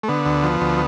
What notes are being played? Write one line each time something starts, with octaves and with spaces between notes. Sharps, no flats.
A3
D3 B3
D2
F3
D2